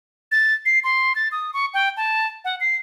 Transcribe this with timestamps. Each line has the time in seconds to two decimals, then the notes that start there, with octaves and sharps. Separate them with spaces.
0.32 A6
0.66 C7
0.84 C6
1.16 A6
1.32 D#6
1.54 C#6
1.74 G5
1.97 A5
2.45 F#5
2.60 C7